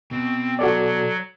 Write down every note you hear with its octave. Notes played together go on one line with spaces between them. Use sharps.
B2 C4
F#3 F#4 A4 D5